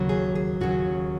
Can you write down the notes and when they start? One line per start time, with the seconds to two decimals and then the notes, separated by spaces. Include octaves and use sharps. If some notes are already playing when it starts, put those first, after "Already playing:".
Already playing: D#2 C#3 F#3
0.09 G#4
0.35 G#4
0.61 D#2 C#3 F#3 F#4